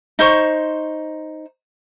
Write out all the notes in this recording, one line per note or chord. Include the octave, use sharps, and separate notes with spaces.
D#4 C5 C#6